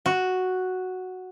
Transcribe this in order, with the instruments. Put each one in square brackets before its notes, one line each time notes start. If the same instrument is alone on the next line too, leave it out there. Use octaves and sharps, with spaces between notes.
[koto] F#4